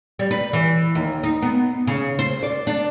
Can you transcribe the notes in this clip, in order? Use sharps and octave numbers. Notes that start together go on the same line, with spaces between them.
G3
B4
E3
D#2
D#4
B3
C#3
C5
D5
D4